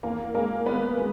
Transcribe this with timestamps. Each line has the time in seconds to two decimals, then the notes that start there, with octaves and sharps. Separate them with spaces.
0.03 E2 A#3 A#4
0.34 G#3 A#3 A#4
0.66 G#3 B3 B4
0.97 G#3